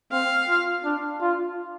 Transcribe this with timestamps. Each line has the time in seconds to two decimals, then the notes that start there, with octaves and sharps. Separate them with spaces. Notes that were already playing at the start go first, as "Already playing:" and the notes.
0.12 C4 F5
0.49 F4
0.84 D4
1.21 F4